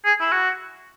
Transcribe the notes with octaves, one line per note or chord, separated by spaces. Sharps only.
G#4
E4
F#4